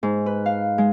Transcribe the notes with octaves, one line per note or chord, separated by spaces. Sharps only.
G#2
B4
F5
G#3